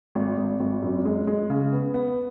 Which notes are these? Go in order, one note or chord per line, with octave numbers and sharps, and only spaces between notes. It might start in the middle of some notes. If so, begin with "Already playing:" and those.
G#1
G#1
G#1
F#2
G#3
G#3
C#3
B3
B3